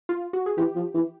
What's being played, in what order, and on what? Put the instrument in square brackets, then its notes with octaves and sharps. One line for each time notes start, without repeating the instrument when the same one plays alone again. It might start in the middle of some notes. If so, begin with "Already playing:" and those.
[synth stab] F4
F#4
G#4
[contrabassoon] E3 [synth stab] G4
[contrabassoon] F3
E3